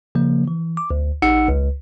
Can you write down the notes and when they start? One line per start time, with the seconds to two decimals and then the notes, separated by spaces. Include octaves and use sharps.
0.15 C#3 F3 A#3
0.48 E3
0.77 D6
0.91 D2
1.22 A1 D#4 F#5 E6 C#7
1.48 C#2